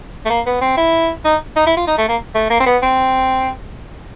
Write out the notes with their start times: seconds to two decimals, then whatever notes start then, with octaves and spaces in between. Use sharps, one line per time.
0.25 A3
0.30 A#3
0.46 B3
0.61 C4
0.77 E4
1.25 D#4
1.56 D#4
1.66 E4
1.77 F4
1.87 D#4
1.98 A3
2.09 A#3
2.35 A3
2.50 A#3
2.60 C4
2.66 B3
2.82 C4